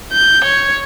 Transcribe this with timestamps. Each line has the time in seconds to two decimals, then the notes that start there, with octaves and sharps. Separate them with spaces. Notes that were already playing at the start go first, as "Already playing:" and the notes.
0.12 G6
0.44 C#5